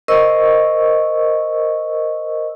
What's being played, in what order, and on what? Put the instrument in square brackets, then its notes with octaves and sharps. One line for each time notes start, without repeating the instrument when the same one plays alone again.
[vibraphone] A#4 C5 D#5 C#6 E6